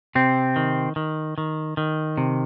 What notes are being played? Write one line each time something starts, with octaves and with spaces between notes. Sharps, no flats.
C3 C4
D#3
D#3
D#3
D#3
C3